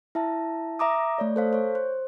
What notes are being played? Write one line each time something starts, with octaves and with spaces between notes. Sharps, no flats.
E4 E5 A5
E5 A#5 D6 D#6
A3 C#5 D5
A4 C5 F5
C5 C#5
C5